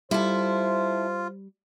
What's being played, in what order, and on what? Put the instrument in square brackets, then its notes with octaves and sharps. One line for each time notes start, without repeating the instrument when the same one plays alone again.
[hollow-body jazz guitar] G3 [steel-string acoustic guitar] E4 A4 [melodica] F4 [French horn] C5